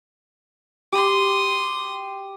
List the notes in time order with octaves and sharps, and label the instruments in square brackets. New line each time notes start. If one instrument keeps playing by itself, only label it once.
[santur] G4 [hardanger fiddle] C6 D#6